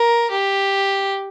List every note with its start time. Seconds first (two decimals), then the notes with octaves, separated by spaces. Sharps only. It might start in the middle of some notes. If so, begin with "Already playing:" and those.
Already playing: A#4
0.31 G4